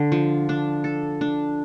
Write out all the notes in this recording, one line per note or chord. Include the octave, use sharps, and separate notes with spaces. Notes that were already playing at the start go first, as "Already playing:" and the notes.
Already playing: D3
F3
D4
A4
D4